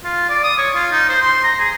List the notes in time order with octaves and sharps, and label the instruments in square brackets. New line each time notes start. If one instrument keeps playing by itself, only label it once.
[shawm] F4
D5
D#6
C#5
F4
D#4
C5
C6
A#5
G#4